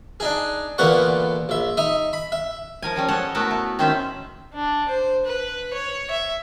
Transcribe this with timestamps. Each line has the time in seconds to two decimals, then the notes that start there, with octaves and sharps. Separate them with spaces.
0.20 D4 D#4 G#4
0.78 E2 A#2 D3 B3 F#5 C#6
1.49 A#1 E5
1.77 D#4 D#5 E5
2.13 B5
2.32 E5
2.82 F3 A#4 G#5
2.96 F3 G3 C#4
3.08 A4 C#5 D#5 F#5
3.35 A3 B3 E4 F#4 A#4
3.51 A3
3.79 D#3 C4 C#4 C5 E5
4.54 D4
4.89 C5
5.26 B4
5.74 C#5
6.11 E5